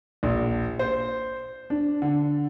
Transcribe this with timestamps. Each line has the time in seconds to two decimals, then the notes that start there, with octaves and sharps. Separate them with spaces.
0.23 A#1
0.79 C5
1.70 D4
2.02 D3